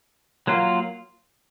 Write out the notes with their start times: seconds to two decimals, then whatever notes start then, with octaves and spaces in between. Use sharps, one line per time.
0.47 F#3 A#3 F4